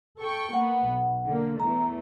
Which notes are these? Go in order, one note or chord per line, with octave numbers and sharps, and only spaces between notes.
A4 G5 C#6
A#3 B3 F#5
B1
D3 A#3
E2 E3 A3 A#5